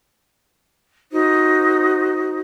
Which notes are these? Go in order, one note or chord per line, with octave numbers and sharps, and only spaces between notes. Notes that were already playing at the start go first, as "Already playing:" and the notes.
D#4 F#4 C5